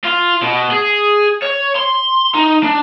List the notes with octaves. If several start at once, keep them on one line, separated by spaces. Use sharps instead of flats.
F4
B2
G#4
C#5
C6
D#4
D4